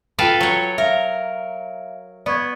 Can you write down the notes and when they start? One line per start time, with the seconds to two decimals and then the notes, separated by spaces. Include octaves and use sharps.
0.19 F4 A4 B4 F5 G5 D7
0.41 F#3 C#5
0.78 A#4 E5 F5
2.26 B3 D5 C#6 G#6